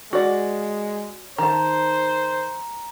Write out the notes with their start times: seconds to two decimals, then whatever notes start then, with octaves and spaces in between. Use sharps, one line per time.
0.13 G#3 F#4 D5
1.38 D#3 C5 A5 A#5